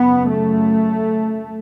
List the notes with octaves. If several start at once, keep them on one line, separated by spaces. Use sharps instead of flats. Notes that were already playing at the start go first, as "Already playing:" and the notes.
Already playing: F#2 C#3 B3
A3